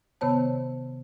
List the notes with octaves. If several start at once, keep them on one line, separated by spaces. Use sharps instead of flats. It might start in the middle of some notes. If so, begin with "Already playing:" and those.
C3 D#3 B3 C5 C#5 A5